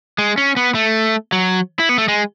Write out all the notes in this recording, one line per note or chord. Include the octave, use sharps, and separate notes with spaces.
G#3
C#4
B3
A3
F#3
E4
B3
A3
G#3